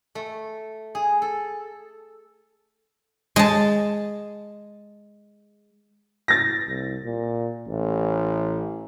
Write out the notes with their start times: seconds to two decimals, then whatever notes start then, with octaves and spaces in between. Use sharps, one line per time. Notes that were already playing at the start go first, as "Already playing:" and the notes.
0.15 A3
0.95 G#4
1.22 A4
3.36 G#3 A5
6.28 A6 A#6
6.67 C2
7.04 A#2
7.68 A1